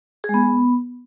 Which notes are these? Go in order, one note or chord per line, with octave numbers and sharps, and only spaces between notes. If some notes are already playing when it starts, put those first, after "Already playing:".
G#4
G#3
B3